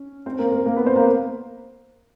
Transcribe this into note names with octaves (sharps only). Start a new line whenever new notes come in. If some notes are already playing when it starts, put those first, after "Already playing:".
Already playing: C#4
C4 C5
A#3 A#4
A#3 A#4
A#3 A#4
B3 B4
C4 C5
A#3 A#4